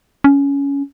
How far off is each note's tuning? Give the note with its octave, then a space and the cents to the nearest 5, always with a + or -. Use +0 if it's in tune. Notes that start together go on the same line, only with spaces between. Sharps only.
C#4 +15